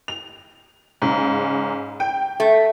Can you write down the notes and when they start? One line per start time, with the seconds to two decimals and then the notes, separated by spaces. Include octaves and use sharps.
0.08 F7
1.02 G#2 C#3
2.00 G5
2.40 A3